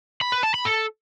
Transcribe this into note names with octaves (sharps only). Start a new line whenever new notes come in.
B5
B4
A5
B5
A4